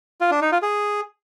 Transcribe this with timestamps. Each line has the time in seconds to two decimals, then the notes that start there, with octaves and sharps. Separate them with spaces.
0.21 F4
0.31 D4
0.42 D#4
0.52 F4
0.62 G#4